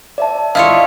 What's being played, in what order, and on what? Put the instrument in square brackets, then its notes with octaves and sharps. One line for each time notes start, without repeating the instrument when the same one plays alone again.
[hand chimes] D5 E5 A5
[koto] E4 F4 C#5 [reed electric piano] D#5 F5